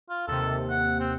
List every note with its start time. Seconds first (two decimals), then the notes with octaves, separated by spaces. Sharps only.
0.10 F4
0.28 D#2 C3 A4
0.70 F#5
1.00 C4